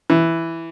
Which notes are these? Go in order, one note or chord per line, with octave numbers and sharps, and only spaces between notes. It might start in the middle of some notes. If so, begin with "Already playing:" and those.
E3